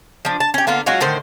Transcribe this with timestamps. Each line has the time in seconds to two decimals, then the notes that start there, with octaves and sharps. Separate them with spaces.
0.25 F3 D4
0.40 A5
0.54 C#4 G4
0.67 D3 A#3 B3 F4
0.86 F#3 G#3 F4 F#4
1.00 A2 D3 D#3 C5